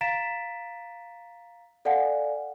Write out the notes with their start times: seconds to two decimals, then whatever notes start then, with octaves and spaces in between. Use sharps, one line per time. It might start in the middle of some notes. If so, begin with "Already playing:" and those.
0.01 F5 A#5 A6 B6 D7 E7
1.85 A4 D5 F5 F#5 G#5